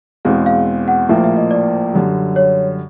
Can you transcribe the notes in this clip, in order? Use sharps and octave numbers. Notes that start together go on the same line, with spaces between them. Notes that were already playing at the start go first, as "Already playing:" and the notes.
E2 B2 G#3 C4 F5
F5
F5
F#5
A#1 A2 F3 A#3 E5
E5
D#5
D5
F#2 D3 G3
C#5